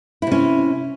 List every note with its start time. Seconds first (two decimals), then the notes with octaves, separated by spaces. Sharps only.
0.22 E4
0.27 C3
0.31 C#4